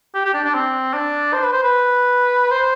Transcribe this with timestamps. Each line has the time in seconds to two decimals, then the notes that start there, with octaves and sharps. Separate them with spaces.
0.15 G4
0.25 G4
0.34 D4
0.44 D4
0.54 C4
0.94 D4
1.33 C5
1.44 B4
1.53 C5
1.63 B4
2.51 C5